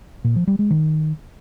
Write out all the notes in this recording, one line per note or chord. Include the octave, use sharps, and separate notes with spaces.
A#2
F3
G3
G#3
D#3